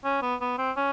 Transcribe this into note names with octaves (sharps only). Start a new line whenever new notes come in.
C#4
B3
B3
C4
C#4